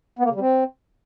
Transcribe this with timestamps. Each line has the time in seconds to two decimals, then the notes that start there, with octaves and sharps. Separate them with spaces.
0.19 B3
0.24 A#3
0.30 C#3
0.35 G3
0.40 C4